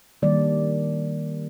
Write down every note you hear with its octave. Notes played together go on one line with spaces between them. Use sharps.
D#3 G3 A#3 D5